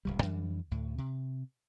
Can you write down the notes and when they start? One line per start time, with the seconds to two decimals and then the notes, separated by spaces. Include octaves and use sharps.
0.05 D1 C#2 G3
0.22 F2 E3 G3 D4
0.71 D2 A2
0.98 C3